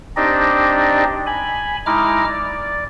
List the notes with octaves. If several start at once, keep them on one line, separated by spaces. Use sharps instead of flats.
C4 D4 D#4 G4 D5 D#5
G#5 B5
G#3 D#4 E4 A#5 D6 F6
D5